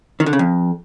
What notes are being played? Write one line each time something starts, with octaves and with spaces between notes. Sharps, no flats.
D#3
D3
C#3
F2